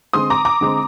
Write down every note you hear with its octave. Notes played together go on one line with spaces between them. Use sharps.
D3 G#3 C4 C6 D#6
A#5 D6
A#5 D6
D3 G#3 C4